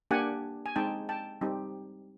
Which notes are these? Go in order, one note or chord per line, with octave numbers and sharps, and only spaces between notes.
A#3 D4 G4 F#5 G#5
G#5
G#3 C4 D#4 G5 A5
G5 A5
G3 C4 D#4 G4